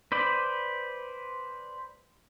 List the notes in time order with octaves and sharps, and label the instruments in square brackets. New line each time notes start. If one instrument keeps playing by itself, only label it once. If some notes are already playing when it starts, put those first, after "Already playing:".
[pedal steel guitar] B4 C5 D5